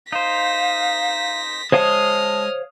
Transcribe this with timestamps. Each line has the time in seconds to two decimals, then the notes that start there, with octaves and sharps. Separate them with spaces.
0.12 D#4 C5 F5 A#6 B6
1.72 G#3 C5 C#5 D#5 F5 A5 D#6 F6